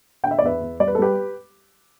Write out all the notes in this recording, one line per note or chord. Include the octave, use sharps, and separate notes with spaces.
D3 G5
E5
D5
E2 B4 E5
E2
G3 D5
B4
A4
G3 G4 B4